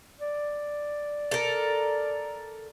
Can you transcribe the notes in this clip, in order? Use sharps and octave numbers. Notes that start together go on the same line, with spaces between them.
D5
A4 A#4